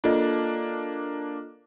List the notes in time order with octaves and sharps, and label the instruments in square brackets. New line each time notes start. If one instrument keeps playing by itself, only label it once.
[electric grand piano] A#3 D4 [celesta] F4 A4 D#5